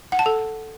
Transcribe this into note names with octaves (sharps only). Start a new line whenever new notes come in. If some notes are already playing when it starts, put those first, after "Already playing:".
F#5
A5
A4